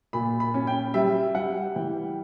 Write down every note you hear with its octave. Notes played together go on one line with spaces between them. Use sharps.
A#2 B5
B5
C#4
G5
G3 E5
G3 F#5
E3 G5